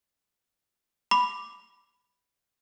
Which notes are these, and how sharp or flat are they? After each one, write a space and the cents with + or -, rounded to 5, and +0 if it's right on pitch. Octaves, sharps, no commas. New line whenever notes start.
B5 +0 D6 +0